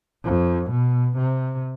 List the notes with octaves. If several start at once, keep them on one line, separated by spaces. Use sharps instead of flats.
F2
B2
C3